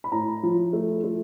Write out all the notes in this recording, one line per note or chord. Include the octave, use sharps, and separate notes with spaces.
B5
A2 A#5
F3
A3
A3